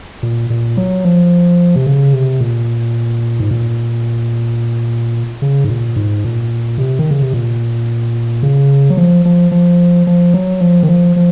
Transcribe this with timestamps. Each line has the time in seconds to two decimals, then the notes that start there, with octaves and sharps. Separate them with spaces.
0.23 A#2
0.50 A#2
0.77 F#3
1.05 F3
1.76 C3
1.86 C#3
2.13 C3
2.41 A#2
3.40 G#2
3.51 A#2
5.42 C#3
5.64 G#2
5.69 A#2
5.96 G#2
6.24 A#2
6.78 C3
6.99 D#3
7.11 C#3
7.21 C3
7.33 A#2
8.43 C#3
8.90 F#3
8.97 F3
9.25 F3
9.51 F3
10.07 F3
10.34 F#3
10.61 F3
10.83 D#3
10.89 F3
11.16 F3